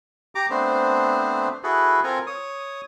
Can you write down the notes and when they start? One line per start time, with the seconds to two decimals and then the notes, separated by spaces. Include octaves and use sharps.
0.35 G4 A#5 D6
0.50 A3 B3 C4 D4 C5
1.64 E4 F#4 G#4 A4 B4
2.04 C4 F4 A4 A#4 G#5
2.27 C#5 D#6